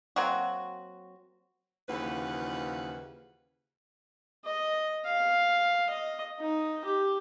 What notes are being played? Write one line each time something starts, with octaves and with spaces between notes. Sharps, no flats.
F#3 A#3 C4 F#4
D#2 C#3 E3 F3 B4 F#5
D#5
F5
D#5
D#4
G4